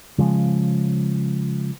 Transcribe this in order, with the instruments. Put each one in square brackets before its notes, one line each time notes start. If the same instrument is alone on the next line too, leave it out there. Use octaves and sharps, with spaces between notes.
[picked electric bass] C#3 F3 G#3